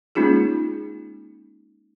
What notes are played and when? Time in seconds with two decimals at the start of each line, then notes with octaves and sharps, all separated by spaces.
0.15 G#3 A#3 C#4 D#4 F4 G#4